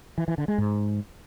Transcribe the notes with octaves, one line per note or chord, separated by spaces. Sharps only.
E3
E3
D3
G#3
G#2